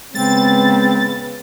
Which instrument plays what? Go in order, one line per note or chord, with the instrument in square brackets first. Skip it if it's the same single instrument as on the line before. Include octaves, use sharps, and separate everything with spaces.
[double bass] C#3 B3 [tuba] G#3 [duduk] C4 [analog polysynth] A6